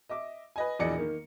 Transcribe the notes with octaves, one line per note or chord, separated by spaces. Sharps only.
D#5 E5 D6
B4 D#5 G#5
E1 A#1 E3 D5 D#5 C#7
D#3 A#3